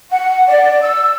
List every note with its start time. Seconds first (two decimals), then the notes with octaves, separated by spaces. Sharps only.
0.11 F#5
0.47 D5
0.82 E6